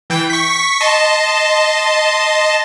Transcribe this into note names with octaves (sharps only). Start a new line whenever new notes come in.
E3 G5
C#6 B6
D#5 A5 C6